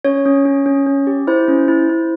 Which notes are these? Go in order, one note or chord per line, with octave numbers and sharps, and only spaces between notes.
C#4 C#5
C#4
C#4
C#4
C#4
G4
E4 C5
C#4
E4
E4